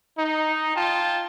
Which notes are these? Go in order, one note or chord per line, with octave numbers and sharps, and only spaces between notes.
D#4
F4 G5 A5